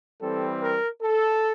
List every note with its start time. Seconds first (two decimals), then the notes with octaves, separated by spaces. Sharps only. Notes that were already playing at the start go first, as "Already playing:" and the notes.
0.22 E3 G3 C4 A4
0.62 A#4
1.02 A4